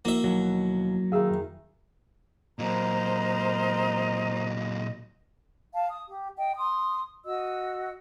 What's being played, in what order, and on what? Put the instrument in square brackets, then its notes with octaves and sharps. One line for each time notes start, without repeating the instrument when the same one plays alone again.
[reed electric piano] F3 E4 F#4 [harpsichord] A#3 E5
[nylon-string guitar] D#2 B2 [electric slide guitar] F#3
[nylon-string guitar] D#3 E4 G#4 [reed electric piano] F5 E6
[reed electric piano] F2
[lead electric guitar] A#2 F#3 [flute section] A#4 C5 A#5 [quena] D#5
[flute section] F5 A5
D#6
G4
D#5 G5
C6 D#6
F#4 D#5 E6